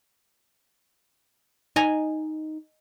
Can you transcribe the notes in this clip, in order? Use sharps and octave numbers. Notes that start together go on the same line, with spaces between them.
D#4 D#5 G#5 A#5